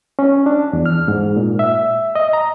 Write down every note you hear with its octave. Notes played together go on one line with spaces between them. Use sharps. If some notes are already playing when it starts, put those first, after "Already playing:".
C#4
D4
E2
F6
G#2
A#2
E5
D#5
A#5